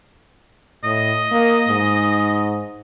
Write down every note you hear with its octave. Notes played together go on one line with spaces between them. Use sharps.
A2 D#5
A#3
G#2